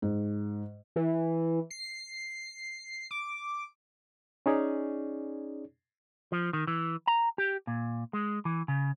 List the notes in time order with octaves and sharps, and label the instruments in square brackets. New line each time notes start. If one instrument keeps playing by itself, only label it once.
[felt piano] G#2
[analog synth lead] E3
C7
D6
[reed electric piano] C#4 D#4 G#4 C#5 D5
[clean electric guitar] F3
D#3
E3
A#5
G4
A#2
G#3
E3
C#3